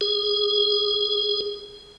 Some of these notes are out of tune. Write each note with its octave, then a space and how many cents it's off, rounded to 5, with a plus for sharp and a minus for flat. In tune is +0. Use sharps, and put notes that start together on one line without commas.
G#4 -10